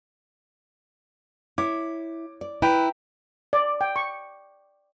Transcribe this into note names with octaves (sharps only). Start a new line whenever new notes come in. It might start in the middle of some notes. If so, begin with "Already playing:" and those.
E4 C#5 D6
D5
E4 B4 E5 G5 A#5
D5
G5
C#6